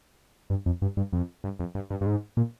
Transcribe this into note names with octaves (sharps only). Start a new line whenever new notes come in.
G2
F2
G2
G2
F2
G2
F2
G2
G2
G2
G#2
A#2